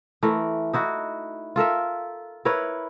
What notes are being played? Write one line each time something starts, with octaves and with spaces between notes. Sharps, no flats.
E3 A3 A#4
D#4 E4 F#4
F4 A4 A#4 E5
E4 A#4 B4 C#5